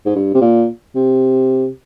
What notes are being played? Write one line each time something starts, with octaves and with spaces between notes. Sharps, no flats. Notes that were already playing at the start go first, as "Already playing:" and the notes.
G#2
G2
C3
A#2
C3